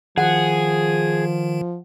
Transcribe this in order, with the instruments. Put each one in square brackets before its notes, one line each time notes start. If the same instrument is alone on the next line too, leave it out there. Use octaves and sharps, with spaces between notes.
[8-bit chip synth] D#3 [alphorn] F3 [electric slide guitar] G#4 [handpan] F#5